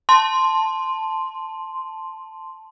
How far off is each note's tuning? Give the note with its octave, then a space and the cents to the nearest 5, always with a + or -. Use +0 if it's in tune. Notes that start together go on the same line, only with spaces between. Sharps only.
A5 +0 C6 +0